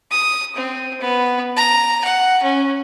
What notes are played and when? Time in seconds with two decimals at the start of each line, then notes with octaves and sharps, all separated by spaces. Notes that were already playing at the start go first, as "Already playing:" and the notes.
0.11 D#6
0.56 C4
1.00 B3
1.57 A#5
2.04 F#5
2.42 C#4